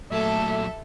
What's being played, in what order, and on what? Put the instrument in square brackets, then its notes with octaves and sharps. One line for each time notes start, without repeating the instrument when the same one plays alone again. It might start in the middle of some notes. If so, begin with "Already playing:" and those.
[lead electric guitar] A#2 F#3 [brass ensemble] A3 [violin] A4 A5 [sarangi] E5